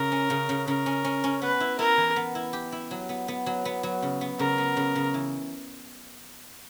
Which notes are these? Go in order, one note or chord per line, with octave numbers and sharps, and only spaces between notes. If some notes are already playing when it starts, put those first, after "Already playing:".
Already playing: C#3 A#4
C#4
C#3
C#3
C#3 A#4
C#4
C#4
C#4
B3 B4
E4
E4 A#4
E3
B3
E4
G4
E4
F#3
B3
B3
F#3
B3
F#3
C#3
B3
C#3 A#4
B3
C#3
C#3
E3